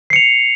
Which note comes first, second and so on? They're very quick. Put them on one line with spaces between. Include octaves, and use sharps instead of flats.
C7 C#7 F7